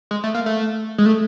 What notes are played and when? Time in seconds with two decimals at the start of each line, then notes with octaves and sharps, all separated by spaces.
0.11 G#3
0.24 A3
0.35 A#3
0.46 A3
0.98 G#3
1.06 A3